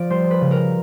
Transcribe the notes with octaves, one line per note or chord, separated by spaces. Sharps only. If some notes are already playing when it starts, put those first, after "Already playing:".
Already playing: F3 D5
G3 C5
B4
C#3
A#4